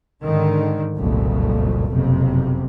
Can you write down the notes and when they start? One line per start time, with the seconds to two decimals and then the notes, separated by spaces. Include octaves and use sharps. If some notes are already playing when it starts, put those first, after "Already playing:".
0.24 G#2 D3 D#3
0.96 F#1 C2 F2 A#2 A3
1.90 F#1 B1 F2 C3